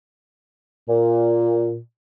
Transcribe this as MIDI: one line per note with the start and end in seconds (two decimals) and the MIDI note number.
0.89 1.77 46